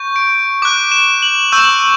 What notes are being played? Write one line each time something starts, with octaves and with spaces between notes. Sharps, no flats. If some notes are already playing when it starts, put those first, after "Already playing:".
Already playing: C#6 G6
D7
D6 F#6
E7
F#7
C#6 E6 G6 E7